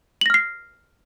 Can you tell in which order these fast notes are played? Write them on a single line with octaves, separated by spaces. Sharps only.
F#7 A#6 F6 C7